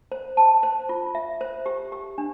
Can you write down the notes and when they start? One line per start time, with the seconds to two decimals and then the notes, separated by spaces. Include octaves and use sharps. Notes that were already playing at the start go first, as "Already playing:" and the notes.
0.12 C5
0.37 A5
0.63 C5
0.89 F4
1.15 E5
1.41 C5
1.66 G4
1.92 G4
2.18 D4